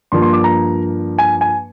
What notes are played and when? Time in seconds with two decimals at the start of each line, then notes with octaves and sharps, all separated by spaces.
0.12 G2 F3 A#3 C6
0.22 C6
0.33 D6
0.44 A#5
1.19 G#5
1.41 G#5